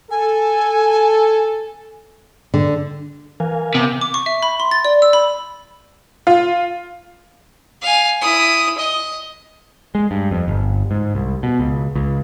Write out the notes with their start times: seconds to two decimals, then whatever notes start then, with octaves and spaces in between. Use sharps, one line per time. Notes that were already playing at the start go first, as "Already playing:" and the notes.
0.11 A4 G#5
2.54 D3
3.40 E3 A#4 F5 G#5
3.75 C3 B3
4.01 D6
4.14 C#6
4.26 E5
4.43 B5
4.60 C6
4.71 A6
4.85 D5
5.02 E6
5.13 B5
6.27 F4
7.82 F5 G#5
8.21 E4 D#6
8.78 D#5
9.95 G#3
10.11 G2
10.31 F2
10.48 G1
10.91 G#2
11.15 C2
11.43 B2
11.60 C#2
11.95 C#2